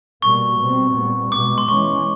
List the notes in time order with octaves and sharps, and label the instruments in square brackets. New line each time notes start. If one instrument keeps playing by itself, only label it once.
[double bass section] B2 G3 A#3 [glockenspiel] C#6
[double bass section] B2 G3 C4
A#2 G3 B3
[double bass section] B2 G#3 B3 [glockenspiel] D6
[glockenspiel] C6
[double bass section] E3 G#3 C#4 [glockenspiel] C#6